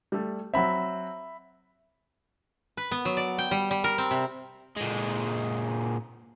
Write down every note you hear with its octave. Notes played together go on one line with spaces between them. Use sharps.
G3 A3
F#3 C4 E5 B5
B4
B3
F#3
D5
G5
G3
G3
A#4
C4
C3
A#2 G#3